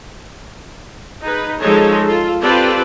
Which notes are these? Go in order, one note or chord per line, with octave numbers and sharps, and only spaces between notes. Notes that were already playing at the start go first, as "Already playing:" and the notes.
D#4 G#4 B4
F3 G#3 D#4 A4 C#5
F4 A4
C4 F4 G4 A4 B4 D5